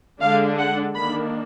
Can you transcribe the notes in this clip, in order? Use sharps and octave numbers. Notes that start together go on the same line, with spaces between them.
D3 G#3 D4 F5
F#5
D#3 A#3 D4 B5